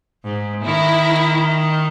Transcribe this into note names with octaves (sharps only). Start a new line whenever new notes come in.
G#2
D#3 E4